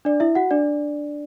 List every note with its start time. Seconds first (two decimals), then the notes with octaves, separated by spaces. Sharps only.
0.05 D4 D5
0.20 E4 E5
0.35 F#4 F#5
0.51 D4 D5